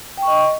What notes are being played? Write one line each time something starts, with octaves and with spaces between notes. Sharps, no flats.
D#5 G5 C#6